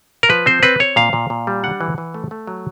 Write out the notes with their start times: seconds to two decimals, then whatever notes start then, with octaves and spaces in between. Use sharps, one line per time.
0.23 A#4
0.29 F3 B4
0.46 C4 C5
0.63 C4 B4
0.79 C4 C#5
0.96 A#2 F5
1.13 A#2
1.30 A#2
1.47 G3
1.64 D4 F#5
1.81 E3
1.98 E3
2.14 A3
2.31 A3
2.47 F#3